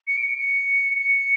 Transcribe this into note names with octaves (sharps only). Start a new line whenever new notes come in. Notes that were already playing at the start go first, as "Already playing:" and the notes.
C#7
D7
C#7
C#7
C#7